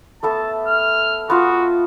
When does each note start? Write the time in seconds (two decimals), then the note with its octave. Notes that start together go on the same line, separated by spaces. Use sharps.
0.23 A3 B3 A4 A5
0.68 F6
1.30 B3 F4 F#4